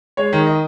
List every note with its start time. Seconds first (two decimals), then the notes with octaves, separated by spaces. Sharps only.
0.17 G#3 C#5
0.33 D#3
0.47 D#5